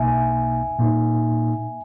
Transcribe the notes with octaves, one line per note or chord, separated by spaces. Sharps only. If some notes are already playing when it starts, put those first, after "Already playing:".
Already playing: B1 B2 A#3 D#4 E5 G#5
A#2 A#3 D#4